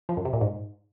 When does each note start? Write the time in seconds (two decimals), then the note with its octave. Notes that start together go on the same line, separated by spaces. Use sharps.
0.09 F3
0.17 F#2
0.25 C3
0.33 A#2
0.41 G#2